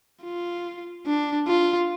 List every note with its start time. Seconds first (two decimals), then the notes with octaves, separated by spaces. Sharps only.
0.23 F4
1.06 D4
1.47 F4